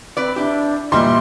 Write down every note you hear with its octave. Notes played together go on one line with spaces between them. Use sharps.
C4 B4 D5
D4 E4 G4
A#2 E3 G3 D#5 C6